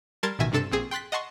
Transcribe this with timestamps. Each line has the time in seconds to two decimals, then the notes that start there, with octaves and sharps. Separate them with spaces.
0.23 G3 A#4 A5 C6 G#6 A6
0.39 A1 B2 D#3 E5 G#5 A#6
0.52 G2 C3 D4 A4 A5 E7
0.71 A#1 C4 G#4
0.91 G5 C6 F#6 A6 B6
1.12 D#5 F#5 A5 C6 C#6